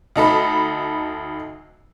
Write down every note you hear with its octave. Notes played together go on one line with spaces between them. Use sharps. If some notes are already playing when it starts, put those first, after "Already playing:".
D2 D#4 A4 B5